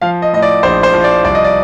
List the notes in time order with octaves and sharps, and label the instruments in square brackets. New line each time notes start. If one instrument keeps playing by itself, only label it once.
[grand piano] F3 F5
D#5
A2 D#5
D5
A#1 C5
C5
F3
D5
C2 D5
D#5
D5